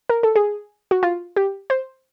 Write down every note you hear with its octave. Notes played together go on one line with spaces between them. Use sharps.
A#4
A4
G#4
F#4
F4
G4
C5